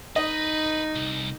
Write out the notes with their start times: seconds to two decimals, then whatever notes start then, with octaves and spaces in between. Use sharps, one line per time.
0.16 D#4 B4 D#5
0.95 C2